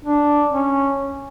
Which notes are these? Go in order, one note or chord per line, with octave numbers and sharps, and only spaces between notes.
D4
C#4